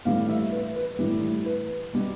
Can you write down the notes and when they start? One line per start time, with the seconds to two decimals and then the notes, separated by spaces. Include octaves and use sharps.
0.05 A2 E3 G3 F5
0.29 E5
0.52 B4
0.76 B4
0.99 A2 E3 G3
1.46 B4
1.93 B2 G3